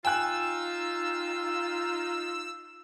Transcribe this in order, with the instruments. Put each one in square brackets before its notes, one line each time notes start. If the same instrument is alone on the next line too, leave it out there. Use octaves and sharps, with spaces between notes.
[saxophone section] D#4 F4 [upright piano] G5 G#5 F#6 [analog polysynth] E6